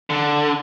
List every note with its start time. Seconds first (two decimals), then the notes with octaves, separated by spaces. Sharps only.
0.10 D3